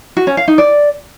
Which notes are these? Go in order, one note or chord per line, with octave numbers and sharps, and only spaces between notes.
F#4
C#4
F5
D#4
D5